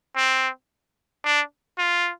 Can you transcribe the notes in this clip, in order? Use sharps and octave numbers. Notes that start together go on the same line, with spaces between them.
C4
D4
F4